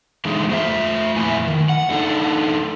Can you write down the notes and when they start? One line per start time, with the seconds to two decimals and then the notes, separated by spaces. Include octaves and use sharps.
0.25 D3 E3 G#3 A3 D#4
0.50 A3 C5 E5
1.16 F2 A#2 E4 G#5
1.47 D#3
1.69 F#5
1.90 A3 D4 D#4 A4